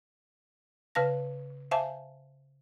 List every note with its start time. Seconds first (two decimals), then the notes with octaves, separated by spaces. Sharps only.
0.95 C#3 B4 F5 A5 A#6
1.71 C5 E5 F5 G#5 A5